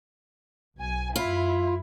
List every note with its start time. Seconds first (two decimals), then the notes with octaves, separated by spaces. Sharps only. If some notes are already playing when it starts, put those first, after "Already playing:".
0.77 B1 G#5
1.16 F#2 E4 F4